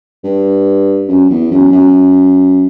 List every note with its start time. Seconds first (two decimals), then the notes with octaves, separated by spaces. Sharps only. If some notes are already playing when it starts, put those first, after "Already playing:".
0.24 G2
1.09 F#2
1.30 E2
1.51 F#2
1.72 F#2